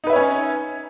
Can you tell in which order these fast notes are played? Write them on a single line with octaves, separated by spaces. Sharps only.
D#4 B4 E5 C#5 C#4